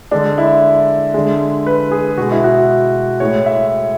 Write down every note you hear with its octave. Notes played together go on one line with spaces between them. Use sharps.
D3 G#3 D4
E4
D3 G#3
B4
G#4
B2 G#3 F#4
E4
F#4
A2 G#3 C#5
E5